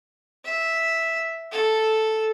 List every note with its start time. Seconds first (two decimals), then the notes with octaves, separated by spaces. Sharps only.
0.45 E5
1.52 A4